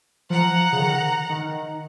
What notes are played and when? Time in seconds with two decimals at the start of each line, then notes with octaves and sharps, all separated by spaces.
0.30 F3 F#5 A#5
0.72 C#3
0.80 D#3
1.30 D#3